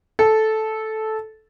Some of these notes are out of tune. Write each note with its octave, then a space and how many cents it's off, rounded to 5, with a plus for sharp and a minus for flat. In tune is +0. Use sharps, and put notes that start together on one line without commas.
A4 -10